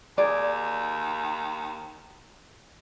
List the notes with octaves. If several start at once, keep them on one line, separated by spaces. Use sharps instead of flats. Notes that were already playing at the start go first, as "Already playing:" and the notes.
D#2 G#4 D5